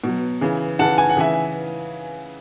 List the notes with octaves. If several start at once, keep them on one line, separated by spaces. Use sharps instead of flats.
B2 F#3
C#3 E3
C#3 E3 F#5 A5
G#5
F#5
C#3 E3 E5 G#5